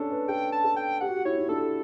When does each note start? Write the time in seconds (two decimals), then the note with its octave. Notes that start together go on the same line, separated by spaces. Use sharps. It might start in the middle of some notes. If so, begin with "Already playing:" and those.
Already playing: C#4 D4 A4
0.11 B4
0.28 A4 G5
0.52 A5
0.64 A4
0.76 G5
1.01 G4 F#5
1.09 F#4
1.16 G4
1.25 E4 C#5
1.38 E4
1.49 D4 A4